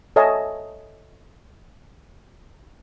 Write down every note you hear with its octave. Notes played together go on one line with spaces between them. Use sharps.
A4 C#5 D#5 E5 G#5 A5